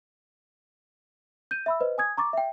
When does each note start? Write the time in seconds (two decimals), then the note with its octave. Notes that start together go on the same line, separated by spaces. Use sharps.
1.51 G6 D#7
1.66 E5 B5 E6
1.81 B4 C5 D#5
1.98 G#5 D#6 G#6
2.17 A#5 C#6 D6 A6
2.33 E5 G5